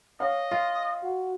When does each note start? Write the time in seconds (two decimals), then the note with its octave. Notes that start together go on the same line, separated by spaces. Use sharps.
0.20 C#5 D#5 F5
0.51 F4
1.03 F#4